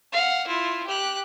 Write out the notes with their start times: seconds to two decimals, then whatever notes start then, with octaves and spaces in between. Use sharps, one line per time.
0.12 F5 F#5
0.47 E4 F4
0.87 G4 F#6